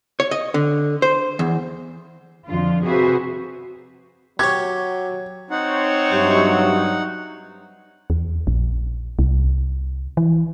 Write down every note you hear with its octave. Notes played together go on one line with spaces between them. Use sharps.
C#5
D#5
D3
C5
E2
F2 D3 F3 F4
C3 F#4 G#4 B4 C5 E5
F#3 G4 C#5 G#6
C4 D#4 C#5 F#5
G2 F#3 G4 D#5 E5
E2
A#1
C2
E3